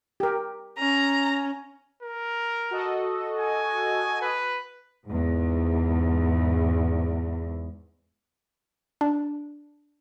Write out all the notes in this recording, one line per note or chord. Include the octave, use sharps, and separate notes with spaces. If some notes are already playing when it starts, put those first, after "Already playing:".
G4 A#4
C#4 A#5
A#4
F#4 A4 D#5
G#5
B4
E2 G#2
D4